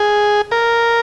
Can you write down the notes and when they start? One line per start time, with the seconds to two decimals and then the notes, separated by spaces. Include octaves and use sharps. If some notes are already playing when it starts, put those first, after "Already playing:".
Already playing: G#4
0.51 A#4